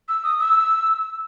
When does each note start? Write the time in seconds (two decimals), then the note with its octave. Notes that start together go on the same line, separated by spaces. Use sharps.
0.09 E6
0.24 D#6
0.40 E6